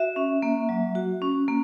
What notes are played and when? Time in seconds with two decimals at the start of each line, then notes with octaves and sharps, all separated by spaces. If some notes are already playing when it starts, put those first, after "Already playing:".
Already playing: F#4 E5
0.16 C#4
0.42 A#3
0.69 F#3
0.95 F#4
1.22 C#4
1.48 A#3